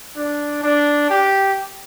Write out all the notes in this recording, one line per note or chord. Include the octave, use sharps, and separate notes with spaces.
D4
D4
G4